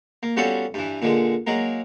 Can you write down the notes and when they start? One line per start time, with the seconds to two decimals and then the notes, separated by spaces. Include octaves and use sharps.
0.23 A#3
0.37 G3 B3 C#4 F4 F#4 A4
0.74 G2 E3
1.02 A#2 D3 G#3
1.47 F#3 G#3 A#3 A#4